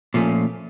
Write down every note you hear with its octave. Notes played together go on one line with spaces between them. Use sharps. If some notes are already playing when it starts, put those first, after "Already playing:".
A#2 F3 A3 C#4